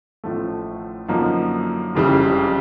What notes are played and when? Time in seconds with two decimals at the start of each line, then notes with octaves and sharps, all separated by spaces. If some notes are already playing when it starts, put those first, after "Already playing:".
0.24 A1 A2 F3 A3
1.09 F#2 D3 F3 A#3 D#4
1.95 F#1 F2 C#3 E3 G3